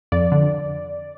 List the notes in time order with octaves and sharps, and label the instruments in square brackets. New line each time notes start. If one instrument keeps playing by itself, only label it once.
[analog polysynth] F2 D5
D3